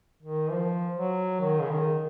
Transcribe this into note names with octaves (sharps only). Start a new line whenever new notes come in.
D#3
F3
F#3
D#3
C#3
D#3